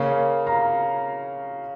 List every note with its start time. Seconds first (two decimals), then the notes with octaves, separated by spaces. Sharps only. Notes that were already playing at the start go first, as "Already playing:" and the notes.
Already playing: C#3 A#3 C#4 C#5 F5
0.47 F5 A#5